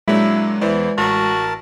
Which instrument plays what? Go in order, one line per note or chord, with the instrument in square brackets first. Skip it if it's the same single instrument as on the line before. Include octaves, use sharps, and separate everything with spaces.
[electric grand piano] A#2 F#3 D4 [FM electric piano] G#3 [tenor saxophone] E4
[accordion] E2 [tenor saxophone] E3 [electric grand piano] E4 C5 D5
[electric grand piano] A1 A#5 [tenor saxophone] F#4 [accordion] A#4 A5